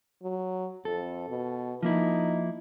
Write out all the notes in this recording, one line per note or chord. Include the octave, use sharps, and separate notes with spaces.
F#3
F2 A4
B2
F3 A#3 D#4 E4